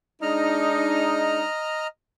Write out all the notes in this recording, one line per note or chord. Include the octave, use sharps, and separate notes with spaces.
G#3 D4 D#4 D#5 A#5 F6